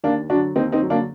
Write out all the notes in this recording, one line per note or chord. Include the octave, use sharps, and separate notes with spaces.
D#2 A#3 D4
D3 F#3 D4 F#4
D#2 C4 D#4
C4 D#4
D3 F#3
A#3 D4